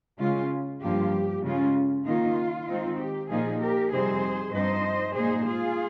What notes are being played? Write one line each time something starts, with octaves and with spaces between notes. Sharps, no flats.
C#3 G#3 C#4 F4
G2 F3 A#3 F4 G4
C#3 G#3 C#4 F4
D#3 A#3 D#4 F4
D#3 G#3 C4 D#4
G4
A#2 F3 A#3 D#4 F4 G#4
G4 A#4
F2 C3 G3 C4 D#4 G#4 C5
G2 F3 C4 D#4 C5 D#5
A#2 G#3 D#4 G#4 C5
F4 G#4